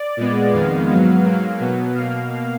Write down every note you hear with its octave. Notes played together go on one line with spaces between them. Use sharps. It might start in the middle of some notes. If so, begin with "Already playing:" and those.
Already playing: D5
A#2 G#3 B3
F2 D#3 G#3 B3 F5
G#2 F#3 B3
G#2 F#3 A#3
B2 F#3 B3
B2 A#3 F5